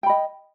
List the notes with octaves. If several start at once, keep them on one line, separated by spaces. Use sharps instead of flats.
D#5 G5 B5